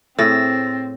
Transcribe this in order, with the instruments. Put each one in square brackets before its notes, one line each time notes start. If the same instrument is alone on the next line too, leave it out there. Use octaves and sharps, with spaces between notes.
[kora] A2 G#4 [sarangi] C4 [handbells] E6 A6 A#6